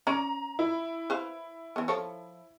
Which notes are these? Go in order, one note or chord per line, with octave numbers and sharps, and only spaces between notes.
C#4 D5 A#5
E4
B4 C5 F5
E3 B3
F3 A4 C#5